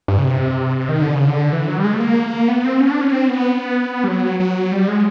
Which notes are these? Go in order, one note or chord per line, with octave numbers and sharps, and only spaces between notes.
G2
C#3
C3
D#3
D3
C#3
D3
E3
F#3
G3
G#3
A3
A#3
B3
C4
C#4
D4
C#4
C4
B3
G3
F#3
F#3
G3
G#3